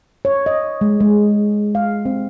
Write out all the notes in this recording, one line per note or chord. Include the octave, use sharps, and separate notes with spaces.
C#5
D#5
G#3
G#3
F5
C4